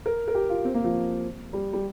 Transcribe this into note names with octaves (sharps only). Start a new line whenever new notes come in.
A#4
A#4
G4
F4
C4
A#3
F3
G3
G3